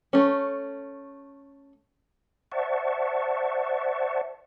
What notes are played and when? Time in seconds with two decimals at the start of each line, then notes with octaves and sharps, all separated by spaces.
0.13 A3 C#4
2.52 C5 D5 E5 F#5 A5 C#6